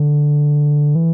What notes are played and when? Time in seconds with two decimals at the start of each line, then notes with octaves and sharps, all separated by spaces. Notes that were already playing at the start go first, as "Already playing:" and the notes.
Already playing: D3
0.95 E3